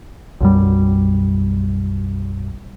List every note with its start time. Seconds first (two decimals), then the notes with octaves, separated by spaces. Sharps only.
0.40 B1 F#2 G3